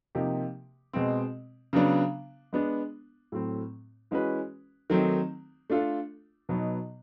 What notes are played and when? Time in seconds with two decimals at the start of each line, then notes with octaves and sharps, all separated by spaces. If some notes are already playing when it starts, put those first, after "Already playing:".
0.15 C3 F3 A#3 D#4 G4
0.93 B2 G#3 C4
1.73 C#3 F#3 B3 D4
2.53 G#3 B3 D4
3.32 A2 F#3 A3 C4
4.11 E3 G#3 C#4 F#4 B4
4.90 D#3 F#3 A3 C4 D#4
5.70 A3 D4 F4 A4
6.49 B2 F#3 B3 D#4